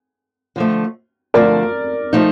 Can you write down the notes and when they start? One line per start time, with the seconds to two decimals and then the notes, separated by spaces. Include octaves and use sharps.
0.56 D3 F3 A3
1.34 D3 F3 A3 A#4 D5
2.13 F3 A3 D#4